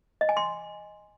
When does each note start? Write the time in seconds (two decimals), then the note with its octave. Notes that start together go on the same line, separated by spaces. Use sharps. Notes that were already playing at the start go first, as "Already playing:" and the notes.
0.21 D#5
0.29 G#5
0.37 C6